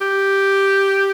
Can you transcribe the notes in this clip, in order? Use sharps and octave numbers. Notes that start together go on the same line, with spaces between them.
G4